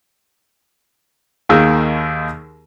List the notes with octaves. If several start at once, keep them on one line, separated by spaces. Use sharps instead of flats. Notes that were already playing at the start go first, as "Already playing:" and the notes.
D#2 D#3 A#3 G#4 E6